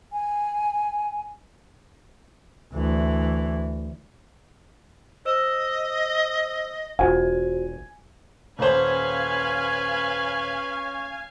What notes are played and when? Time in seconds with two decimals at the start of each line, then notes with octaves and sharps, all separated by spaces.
0.13 G#5
2.73 D2 E3
5.25 C5 D#5 E6 E7
6.99 E1 F4 F#4 C5 G#5
8.59 D#1 C#4 B4 C5 F5 G#5 B5